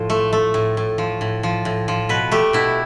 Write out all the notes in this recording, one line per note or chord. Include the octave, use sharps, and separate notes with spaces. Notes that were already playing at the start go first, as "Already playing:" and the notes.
Already playing: A2 F3 C5
A3
A3
A2
A2
F3
A2
F3
A2
F3
B2 B4
A3 G4
B2 E4